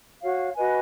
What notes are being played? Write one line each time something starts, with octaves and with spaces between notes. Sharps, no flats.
F#4 C#5 F5
F#4 B4 D#5 G#5